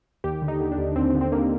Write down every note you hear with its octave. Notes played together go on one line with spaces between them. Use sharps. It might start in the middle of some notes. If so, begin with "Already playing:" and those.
D#2 G4
D3
D#4
D3
D4
D#2
D#2 C4
D3
C4
D3 A#3